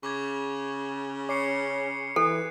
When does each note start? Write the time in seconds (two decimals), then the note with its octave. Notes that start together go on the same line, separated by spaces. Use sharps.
0.03 C#3 C#6 D6 G#6
1.29 C#4 D6 C7 C#7
2.16 E3 A4 F#6